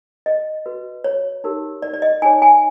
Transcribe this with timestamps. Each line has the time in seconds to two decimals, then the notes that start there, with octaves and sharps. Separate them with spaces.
0.26 D#5
0.66 F#4 B4
1.04 C#5
1.44 D#4 G4 A#4
1.82 D5
1.94 D5
2.02 D#5
2.22 D#4 G#4 C#5 G#5
2.42 G#5